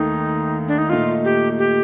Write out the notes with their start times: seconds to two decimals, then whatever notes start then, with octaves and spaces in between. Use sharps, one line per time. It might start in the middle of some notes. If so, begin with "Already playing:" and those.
Already playing: D#2 D#3 A3 D#4
0.68 D4
0.78 D#4
0.90 A#2 A3 D#4 F4
1.25 G4
1.58 G4